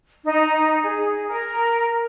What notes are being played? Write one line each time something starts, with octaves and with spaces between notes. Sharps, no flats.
D#4
G#4
A#4